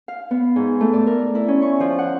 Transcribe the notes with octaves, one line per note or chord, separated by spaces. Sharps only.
F5
B3
G#2
A3
D5
A#4
E4
C#4
C#6
F3
F#5